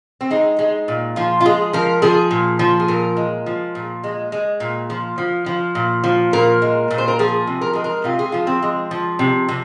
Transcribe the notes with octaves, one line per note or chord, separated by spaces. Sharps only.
C4
G#3 D#4
G#3
A#2
F3 F4
F4
G#3 G#4
F3 A#4
F3 G#4
A#2
F3
G#4
A#2 A#4
G#3
F3
A#2
G#3
G#3
A#2
F3
F3
F3
A#2
F3
A#2 A#4
G#3
A#2
C5
A#4
F3 G#4
C3
A#4
G#3 G#4
A#4
C3 F4
G#4
F3 F4
C4
G#3
F3
C3
C3